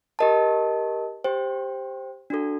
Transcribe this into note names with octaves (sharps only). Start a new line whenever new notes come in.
G4 A#4 D#5 A5
G4 C5 G5
D4 F#4 A4